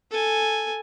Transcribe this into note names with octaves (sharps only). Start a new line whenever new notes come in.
A4 G#5